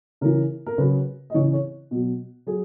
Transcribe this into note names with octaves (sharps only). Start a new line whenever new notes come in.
C#3 E3 A#4
A#4
C#3 F#3 B4
D#5
C#3 E3 C#5
C#5
B2 F#3
F#3 G#4